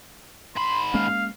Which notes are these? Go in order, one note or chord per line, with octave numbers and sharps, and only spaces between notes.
G#2 B5 C6
G#3 A#3 C#4 F5